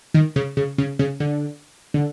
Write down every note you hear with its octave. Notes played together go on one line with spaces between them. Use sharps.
D#3
C#3
C#3
C#3
C#3
D3
D3